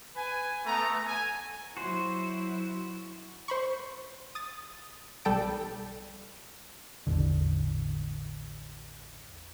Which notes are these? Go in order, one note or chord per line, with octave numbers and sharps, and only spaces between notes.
B4 G#5
A3 B3 A#5
G#5
F#3 E4 F#4 C5
C5 B5 C#6
D#6 A6
B1 G3 A4 G5 A5 D7
A1 E2 D3